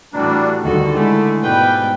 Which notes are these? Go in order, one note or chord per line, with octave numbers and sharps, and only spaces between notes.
A2 E3 G3 D4 F#4 A#5
D2 D3 D#3 G3 F#4 A4 D5
G#3 A3 E4
G#2 B2 G3 B4 G5